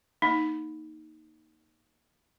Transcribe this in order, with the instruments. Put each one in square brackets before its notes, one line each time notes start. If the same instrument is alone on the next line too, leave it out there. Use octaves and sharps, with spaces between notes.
[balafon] A#3 D#4